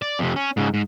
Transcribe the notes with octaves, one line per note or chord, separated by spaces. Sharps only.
D5
F2 C3
C#4
G#2 C#3
G#2